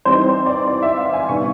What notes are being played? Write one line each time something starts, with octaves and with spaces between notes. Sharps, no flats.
E3 G3 C4 D#4 C5
C5
D5
D5
E5
F5
G#5
C3 D#3 G3 B3 D4 C#6